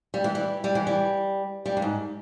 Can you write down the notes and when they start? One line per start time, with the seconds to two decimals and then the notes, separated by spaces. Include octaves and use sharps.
0.14 G3
0.24 E3
0.35 G3
0.64 G3
0.75 E3
0.87 G3
1.66 G3
1.77 G2
1.82 G#2